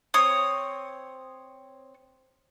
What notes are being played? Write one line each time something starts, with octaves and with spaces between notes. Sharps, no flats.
C4 C#5 D#6